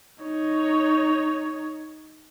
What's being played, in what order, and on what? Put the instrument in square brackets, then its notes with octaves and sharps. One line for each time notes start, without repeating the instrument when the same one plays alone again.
[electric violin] D#4 C#5